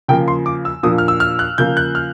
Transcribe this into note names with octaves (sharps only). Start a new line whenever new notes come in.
C#3 F3 A#3 G5
C6
D6
E6
A#2 F3 A#3 D4 D#6
F6
E6
F6
F#6
C#3 F3 A#3 G6
F#6
F6